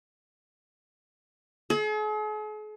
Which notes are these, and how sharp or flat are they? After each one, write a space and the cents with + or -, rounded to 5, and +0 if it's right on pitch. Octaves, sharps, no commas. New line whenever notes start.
G#4 +45